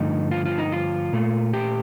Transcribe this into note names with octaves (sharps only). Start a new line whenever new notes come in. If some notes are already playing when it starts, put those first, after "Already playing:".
Already playing: G2 D3 F3 A3 D#4
F4
F4
D#4
F4
A#2 A3
G4